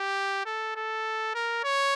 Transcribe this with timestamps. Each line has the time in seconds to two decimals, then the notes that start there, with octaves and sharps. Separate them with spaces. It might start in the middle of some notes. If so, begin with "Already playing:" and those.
Already playing: G4
0.46 A4
0.76 A4
1.35 A#4
1.64 C#5